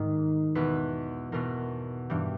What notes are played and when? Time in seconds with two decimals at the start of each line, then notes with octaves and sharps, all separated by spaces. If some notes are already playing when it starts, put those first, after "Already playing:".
Already playing: G#2 D#3
0.55 E2 B2 B4
1.32 E2 B2 A#4
2.10 G2 E3 G4